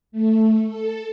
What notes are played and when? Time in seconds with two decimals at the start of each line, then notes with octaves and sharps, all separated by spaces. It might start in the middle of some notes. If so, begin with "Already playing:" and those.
0.12 A3
0.66 A4